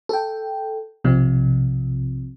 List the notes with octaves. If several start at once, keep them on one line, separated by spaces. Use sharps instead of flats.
A4 G5
B1 C3 F3